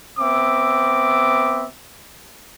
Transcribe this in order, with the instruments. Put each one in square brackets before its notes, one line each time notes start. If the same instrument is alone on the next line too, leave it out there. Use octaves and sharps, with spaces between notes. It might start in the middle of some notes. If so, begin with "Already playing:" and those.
[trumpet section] B3 C4 E5 D6